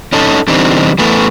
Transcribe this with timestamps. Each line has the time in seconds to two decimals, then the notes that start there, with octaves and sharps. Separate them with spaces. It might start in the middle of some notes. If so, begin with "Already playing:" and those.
0.13 C#4 D#4 A4
0.48 D3 E3 G3 C4 D#4
0.98 E3 A3 B3